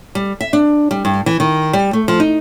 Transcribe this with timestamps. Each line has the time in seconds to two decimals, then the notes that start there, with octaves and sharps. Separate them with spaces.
0.15 G3
0.41 E5
0.53 D4
0.91 G3
1.05 G2
1.26 E3
1.40 D#3
1.73 G3
1.93 A3
2.08 F3
2.20 D#4